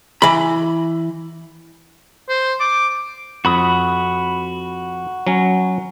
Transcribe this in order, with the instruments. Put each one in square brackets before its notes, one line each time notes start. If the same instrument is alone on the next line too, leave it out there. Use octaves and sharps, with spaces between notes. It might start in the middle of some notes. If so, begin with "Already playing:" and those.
[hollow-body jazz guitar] E3 B5
[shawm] C5
D6
[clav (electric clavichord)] F2 [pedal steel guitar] F#4 B5 D#6
[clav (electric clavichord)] F#3 C#4